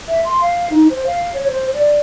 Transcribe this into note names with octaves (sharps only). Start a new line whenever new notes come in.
E5
C6
F5
D#4
C5
F5
C#5
C5
D5